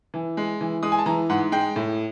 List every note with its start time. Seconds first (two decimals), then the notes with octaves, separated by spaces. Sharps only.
0.14 E3
0.37 G#3
0.61 E3
0.83 G#3 D#6
0.92 G#5
0.99 A5
1.06 E3 A#5
1.30 G#2 F#5
1.52 G#3 G5
1.76 A2